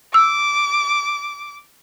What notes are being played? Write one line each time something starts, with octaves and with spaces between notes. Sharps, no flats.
D6 E6